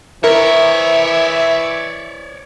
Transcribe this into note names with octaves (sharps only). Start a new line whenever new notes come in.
E3 A#4 C#5 D5 E5